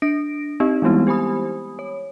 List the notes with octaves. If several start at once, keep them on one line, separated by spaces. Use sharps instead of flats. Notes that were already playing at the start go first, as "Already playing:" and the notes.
D4 A#6 D7
C4 D#4 G4 D#5
E3 G3 G#3 B3 E4
G4 C5 G#5 B5 D#6
C#5